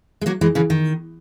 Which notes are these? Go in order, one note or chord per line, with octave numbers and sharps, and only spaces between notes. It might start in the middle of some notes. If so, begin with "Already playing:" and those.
G#3
F#3 A#3
E3 G#3
C#3 E3
D#3